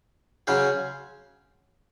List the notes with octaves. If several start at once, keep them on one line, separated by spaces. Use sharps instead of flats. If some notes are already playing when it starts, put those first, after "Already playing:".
C#3 F#3 C#4 G#4 C5